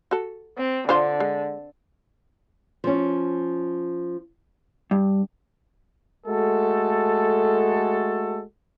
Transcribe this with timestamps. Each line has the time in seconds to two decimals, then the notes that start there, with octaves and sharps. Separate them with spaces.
0.11 F#4 A4
0.58 C4
0.89 D3 D4 F4 C5
1.20 G#3
2.84 F3 C#4
4.91 G2
6.26 G#3 A3 F#4 A4